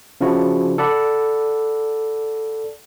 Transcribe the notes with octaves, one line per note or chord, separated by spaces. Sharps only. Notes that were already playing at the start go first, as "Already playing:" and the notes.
C#3 F3 D4 E4 F#4
A4 D5 F#5 B5